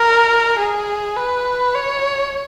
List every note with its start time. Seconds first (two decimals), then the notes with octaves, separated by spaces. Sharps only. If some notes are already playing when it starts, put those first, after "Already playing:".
Already playing: A#4
0.59 G#4
1.17 B4
1.75 C#5